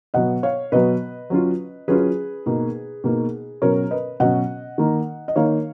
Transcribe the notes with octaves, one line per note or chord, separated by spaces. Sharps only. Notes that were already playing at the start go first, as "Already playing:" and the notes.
B2 F#3 B3 D#5 F#5
C#5 F5
B2 F#3 B3 B4 D#5
F#3 C#4 F4
F#3 C#4 F4 G#4 B4
B2 A#3 D#4
B2 A#3 D#4
B2 F#3 C#4 A#4 C#5
B4 D#5
B2 F#3 C#4 D#5 F#5
D#3 A#3 D#4
D#5
D#3 A#3 D#4 C#5 F5